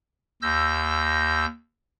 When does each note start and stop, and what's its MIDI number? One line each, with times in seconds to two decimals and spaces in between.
0.42 1.45 39
0.42 1.45 88
0.42 1.45 91
0.42 1.45 94